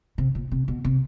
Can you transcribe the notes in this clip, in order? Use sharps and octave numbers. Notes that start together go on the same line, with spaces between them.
C3
A#2
C3
B2
C3